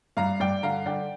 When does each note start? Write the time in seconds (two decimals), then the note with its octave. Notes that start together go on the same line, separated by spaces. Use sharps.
0.17 G2 F5 A#5
0.40 G2 D5 G5
0.62 D3 F5 A#5
0.86 D3 D5 G5